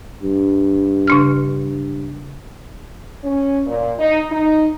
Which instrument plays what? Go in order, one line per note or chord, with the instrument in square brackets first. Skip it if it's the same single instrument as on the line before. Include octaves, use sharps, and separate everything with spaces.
[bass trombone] G2
[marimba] C#3 D4 F6
[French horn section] C#4
A#2
D#4
D#4